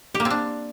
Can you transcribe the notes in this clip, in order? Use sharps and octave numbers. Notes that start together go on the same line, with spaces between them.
G4
A#3
C4
D4